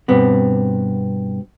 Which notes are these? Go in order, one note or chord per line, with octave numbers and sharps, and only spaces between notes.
G2 B2 B3 C4